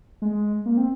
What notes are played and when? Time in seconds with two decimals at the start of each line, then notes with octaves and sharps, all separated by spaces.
0.22 G#3
0.66 A#3
0.77 C4